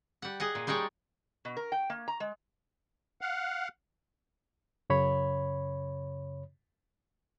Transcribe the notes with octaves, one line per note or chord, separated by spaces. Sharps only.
G3 F#5
G#4 D#5 F#5
A#2
G3 G#3 D#4 C#5 D5
B2
A#4
G5
A#3
A#5
G#3
F5 F#5
F#2 C#3 C#5 B5